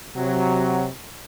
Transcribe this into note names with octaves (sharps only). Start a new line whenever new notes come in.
C3 F#3